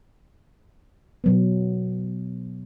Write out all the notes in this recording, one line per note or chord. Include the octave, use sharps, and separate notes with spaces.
B2 F#3 B3